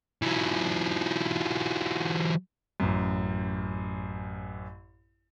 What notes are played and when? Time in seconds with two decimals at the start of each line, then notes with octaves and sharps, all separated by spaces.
0.22 E3 F#3
2.80 A1 F#2